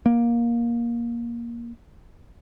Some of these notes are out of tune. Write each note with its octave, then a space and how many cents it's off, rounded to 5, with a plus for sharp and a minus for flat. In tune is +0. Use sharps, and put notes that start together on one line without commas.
A#3 +15